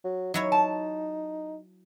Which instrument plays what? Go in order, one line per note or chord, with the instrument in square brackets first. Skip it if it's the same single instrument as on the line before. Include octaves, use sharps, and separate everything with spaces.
[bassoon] F#3
[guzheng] F#3 E4 C#5 [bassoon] D#4
[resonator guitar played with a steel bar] A5